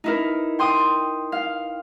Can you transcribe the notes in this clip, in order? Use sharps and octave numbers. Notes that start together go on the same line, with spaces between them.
D#4 E4 A#4
G5 C6 D#6
F5